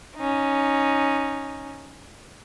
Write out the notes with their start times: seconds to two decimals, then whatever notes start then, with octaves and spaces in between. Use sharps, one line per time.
0.18 C#4 D#4